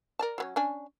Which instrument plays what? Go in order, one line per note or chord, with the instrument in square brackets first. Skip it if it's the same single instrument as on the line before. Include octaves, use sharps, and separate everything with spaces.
[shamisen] A#4 D5 A5
F#3 B3 C#4
C#4 D4 G#5